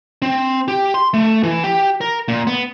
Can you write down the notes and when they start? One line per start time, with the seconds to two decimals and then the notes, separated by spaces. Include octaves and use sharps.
0.22 C4
0.68 G4
0.94 C6
1.14 A3
1.43 E3
1.64 G4
2.01 A#4
2.28 A#2
2.47 B3